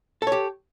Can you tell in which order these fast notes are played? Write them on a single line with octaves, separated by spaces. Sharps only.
A4 C#5 G4